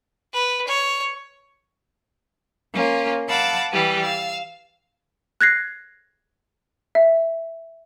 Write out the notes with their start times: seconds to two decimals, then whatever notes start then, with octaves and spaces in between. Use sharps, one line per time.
0.33 B4
0.68 C#5
2.74 A#3 C#4 F4
3.28 F5 F#5 A5 B5 D6 E6
3.72 E3 G3 G4 B4
4.03 F5 E6
5.41 F#6 G#6 A#6 C7
6.95 E5